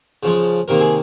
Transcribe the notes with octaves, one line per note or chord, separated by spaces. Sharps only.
C#3 F3 G#3
C3 D#3 A#3 A#4
G#4